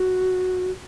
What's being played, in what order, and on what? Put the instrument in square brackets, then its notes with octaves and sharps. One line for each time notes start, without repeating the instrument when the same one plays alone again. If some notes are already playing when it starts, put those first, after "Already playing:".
Already playing: [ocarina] F#4